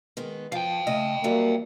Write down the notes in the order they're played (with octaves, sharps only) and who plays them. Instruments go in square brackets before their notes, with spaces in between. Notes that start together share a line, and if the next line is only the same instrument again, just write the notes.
[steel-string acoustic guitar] D#3 G#3 B3
[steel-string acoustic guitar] F3 [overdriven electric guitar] F5 G5
[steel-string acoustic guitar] C#3 A3 D#5
[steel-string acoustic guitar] E3 F#3 G3 [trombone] A#3